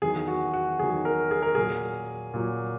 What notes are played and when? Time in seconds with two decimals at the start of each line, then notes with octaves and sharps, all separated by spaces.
0.02 E2 D#3 F#3 G#4
0.28 F#4
0.53 F#4
0.79 E2 D#3 F#3 G#4
1.05 A#4
1.31 G#4
1.43 A#4
1.55 A#2 F#3 G#4
2.34 A#2 F#3